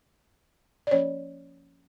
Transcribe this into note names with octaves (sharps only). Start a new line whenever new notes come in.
D5
F3 A#3 C#4 C#5